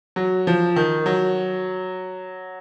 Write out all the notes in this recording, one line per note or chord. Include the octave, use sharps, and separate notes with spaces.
F#3
F3
D#3
F#3